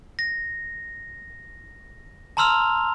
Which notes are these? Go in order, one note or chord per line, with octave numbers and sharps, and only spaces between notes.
A#6
A5 A#5 C6 E6 F6 F7